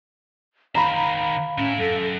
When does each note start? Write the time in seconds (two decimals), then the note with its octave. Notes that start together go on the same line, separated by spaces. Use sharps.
0.75 D#3 C5 F5 A#5 B5
1.58 A2 C#4 E4
1.79 F#2 A4